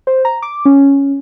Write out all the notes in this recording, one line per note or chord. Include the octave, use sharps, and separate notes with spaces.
C5
A#5
D6
C#4